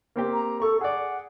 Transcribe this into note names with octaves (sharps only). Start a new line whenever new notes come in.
A#3 C4 G4
A#5
A4 C#6
G#4 D5 F#5